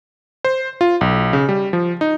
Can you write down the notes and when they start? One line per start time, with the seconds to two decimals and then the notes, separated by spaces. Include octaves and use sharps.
0.45 C5
0.81 F4
1.01 B1
1.33 C#3
1.49 G3
1.73 F3
2.01 D#4